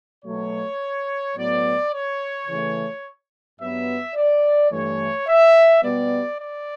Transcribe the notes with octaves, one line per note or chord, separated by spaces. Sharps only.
B2 F#3 A3 C#5
A2 F#3 B3 D5
C#5
C#3 E3 A3
G2 F#3 B3 E5
D5
G2 E3 A3 C#5
E5
B2 G3 B3 D5
D5